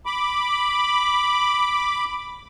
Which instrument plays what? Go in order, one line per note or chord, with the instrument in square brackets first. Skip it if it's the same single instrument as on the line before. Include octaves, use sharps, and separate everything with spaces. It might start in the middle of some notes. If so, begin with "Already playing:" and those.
[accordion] B5 D6